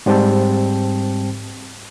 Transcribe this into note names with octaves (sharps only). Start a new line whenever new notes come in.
G#2 G3 C4 G5 A5